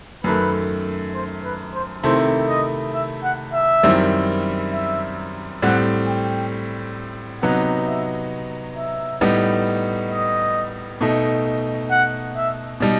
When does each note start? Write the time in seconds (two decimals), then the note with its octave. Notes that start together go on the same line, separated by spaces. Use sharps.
0.24 F#2 D#3 A3 B4
1.14 C5
1.44 B4
1.74 C5
2.03 C3 D#3 A3 E4 C5
2.48 D#5
2.93 E5
3.23 F#5
3.53 E5
3.83 F#2 D#3 G3 C4 E4
4.73 E5
5.62 A2 G3 C4 F#5
6.07 G5
7.42 C3 F#3 B3 D#4 F#5
7.87 E5
8.76 E5
9.21 A2 G3 B3 D#4
10.11 D#5
11.01 B2 A3 D#4
11.90 F#5
12.36 E5
12.80 B2 G3 D#4